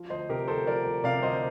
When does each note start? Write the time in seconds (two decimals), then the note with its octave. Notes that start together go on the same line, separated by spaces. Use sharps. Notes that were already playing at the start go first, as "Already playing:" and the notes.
Already playing: F3
0.10 D2 C5 D#5
0.29 C3 G4 A#4
0.48 D2 A4 C5
0.67 F3 A#4 D5
0.85 D2
1.04 C3 D5 F5
1.23 D2 C5 D#5